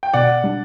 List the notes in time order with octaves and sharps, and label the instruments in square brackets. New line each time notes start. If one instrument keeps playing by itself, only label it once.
[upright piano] G5
[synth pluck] B2 [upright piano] D5 F#5
[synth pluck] G3 D4